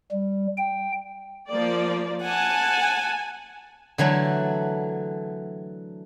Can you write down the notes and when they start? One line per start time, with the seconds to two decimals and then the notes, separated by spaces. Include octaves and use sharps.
0.11 G3
0.58 G5
1.50 F3 A#3 D5
2.23 F#5 G#5 A5
3.98 D3 E3 F#3 A3